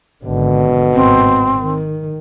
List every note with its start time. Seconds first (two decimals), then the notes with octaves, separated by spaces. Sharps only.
0.25 G#1 B2 D3
0.94 G#1 A2 C4
1.59 D#3